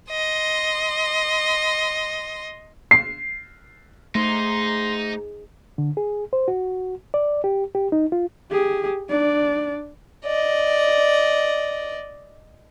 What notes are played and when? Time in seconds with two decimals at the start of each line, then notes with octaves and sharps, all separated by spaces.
0.11 D#5 C6
2.91 C7
4.15 G#2 A3 D#4 C6
5.78 D3
5.97 G#4
6.33 C5
6.48 F#4
7.14 D5
7.44 G4
7.75 G4
7.92 D#4
8.12 F4
8.51 G4 G#4
9.10 D4 D5
10.25 D5 D#5